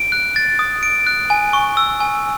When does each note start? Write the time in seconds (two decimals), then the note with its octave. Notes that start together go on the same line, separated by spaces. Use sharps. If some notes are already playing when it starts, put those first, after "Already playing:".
Already playing: D7
0.12 F#6
0.36 A6
0.59 D#6
0.83 D7
1.07 F#6
1.30 G#5
1.53 C#6
1.77 E6
2.01 G#5